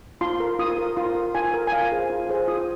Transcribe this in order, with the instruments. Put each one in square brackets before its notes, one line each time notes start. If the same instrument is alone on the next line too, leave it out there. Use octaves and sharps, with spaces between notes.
[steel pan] F4 C6
A#4
F4 D#6
A#4
F4 C6
A#4
F4 G#5
A#4
G#5
F4 F5
G#4 C5
F4
G#4 C5
F4 D#6